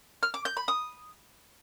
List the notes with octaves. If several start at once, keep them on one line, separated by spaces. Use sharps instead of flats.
F6
D6
G6
B5
D#6